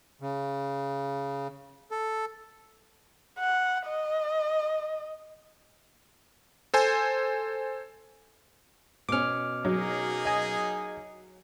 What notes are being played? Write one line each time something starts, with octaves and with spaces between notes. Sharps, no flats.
C#3
A4
F#5
D#5
A4 C5 G#5
B2 C#4 D6 F6
F#3 A#3 D#4 G#4
D#5 G#5